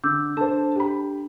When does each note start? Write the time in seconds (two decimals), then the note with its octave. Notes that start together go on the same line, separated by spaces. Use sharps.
0.04 D3 D6 E6 G6
0.37 D4 A4 C5 A5
0.76 G4 B5